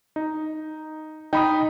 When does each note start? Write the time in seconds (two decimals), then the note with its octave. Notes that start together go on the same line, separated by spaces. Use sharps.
0.16 D#4
1.33 D#4 G5 B5 D#6